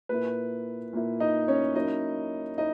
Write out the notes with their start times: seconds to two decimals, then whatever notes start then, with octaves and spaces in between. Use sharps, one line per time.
0.09 A#2 A#3 E4 B4
0.93 A#2 A#3 E4
1.20 D#4 D#5
1.48 C#4 C#5
1.75 F#3 A#3 C#4 D#4 E4 D#5
2.58 D#4 E4 D#5